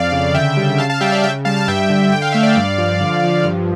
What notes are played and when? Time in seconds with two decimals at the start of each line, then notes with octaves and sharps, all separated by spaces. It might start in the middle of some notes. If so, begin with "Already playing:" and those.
Already playing: F2 D5 F5
0.12 C#3
0.34 D3 E5 G5
0.57 G3
0.78 C#3 F5 A5
0.90 F5 A5
1.01 G3 E5 G5
1.12 D5 F5
1.23 C#3 E5 G5
1.45 G3 F5 A5
1.56 F5 A5
1.68 G2 E5 G5
1.90 D3
2.12 D3 G5
2.22 F5
2.32 A3 E5
2.43 D5 F5
2.56 G2
2.78 F3
3.01 D3
3.23 F3
3.45 G2